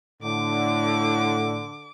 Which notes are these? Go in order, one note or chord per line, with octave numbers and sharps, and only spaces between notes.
A2 D3 D6